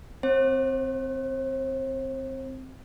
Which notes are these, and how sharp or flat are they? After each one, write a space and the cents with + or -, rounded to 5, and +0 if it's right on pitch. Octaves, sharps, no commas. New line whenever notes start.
C4 -5 C5 +40